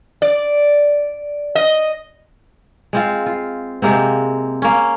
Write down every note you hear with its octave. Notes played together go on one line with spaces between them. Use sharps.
D5
D#5
G#3 C4 F4
F4
C3 G#3 A#3 C4
A#3 C#4